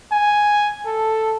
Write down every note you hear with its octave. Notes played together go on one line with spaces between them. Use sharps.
G#5
A4